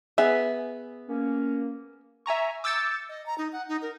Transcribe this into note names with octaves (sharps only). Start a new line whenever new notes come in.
B3 G#4 E5
A#3 C#4
E5 G#5 A#5 C#6
D6 E6 G6 A6 C#7
D#5
A#5
D#4
F#5
D#4
A#4